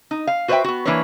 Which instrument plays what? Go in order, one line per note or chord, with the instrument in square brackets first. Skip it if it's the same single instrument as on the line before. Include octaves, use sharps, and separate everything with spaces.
[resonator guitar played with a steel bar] D#4
F5
F#4 B4 C5 D5 E5 G5
B3 F#4
E3 A#3 D4 B4 C#5